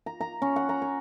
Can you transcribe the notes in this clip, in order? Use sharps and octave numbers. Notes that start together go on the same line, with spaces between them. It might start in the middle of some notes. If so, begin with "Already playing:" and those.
A#5
A#5
C#4
F#5
A#5
C#5